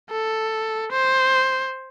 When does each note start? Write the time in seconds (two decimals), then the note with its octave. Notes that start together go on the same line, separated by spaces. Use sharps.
0.11 A4
0.91 C5